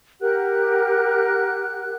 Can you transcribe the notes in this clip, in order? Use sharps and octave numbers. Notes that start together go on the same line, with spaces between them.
G4 A#4 F#5 F#6